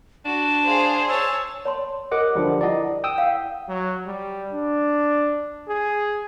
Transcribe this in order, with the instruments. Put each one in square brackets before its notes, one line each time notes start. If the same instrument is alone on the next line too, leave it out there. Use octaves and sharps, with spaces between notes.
[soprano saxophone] D4 [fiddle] F#4 [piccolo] E7
[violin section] G#4 C5 [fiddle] F5
[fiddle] C#5 A5 [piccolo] E6
[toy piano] C#5 A5 C6
[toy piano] G4 A#4 [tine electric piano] D#5 F#5 D6
[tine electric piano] D3 F3 G3
[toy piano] E4 F#5 A5 [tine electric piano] D5 D#5
[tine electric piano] G5 D#6 E6
[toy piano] F5 F#5
[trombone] F#3
G3
D4
G#4